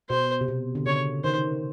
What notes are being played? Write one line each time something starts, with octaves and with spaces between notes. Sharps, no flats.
B2 C5
C3
B2
D3
C#3 C#5
D#3 C5